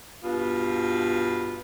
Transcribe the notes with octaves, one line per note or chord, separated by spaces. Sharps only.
G2 B2 F4